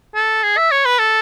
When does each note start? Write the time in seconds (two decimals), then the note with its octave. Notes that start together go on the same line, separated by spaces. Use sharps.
0.15 A4
0.43 G#4
0.57 E5
0.71 C#5
0.85 B4
0.99 A4